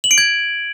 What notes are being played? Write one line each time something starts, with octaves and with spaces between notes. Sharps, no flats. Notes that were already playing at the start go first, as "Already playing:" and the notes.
F#7
D7
G#6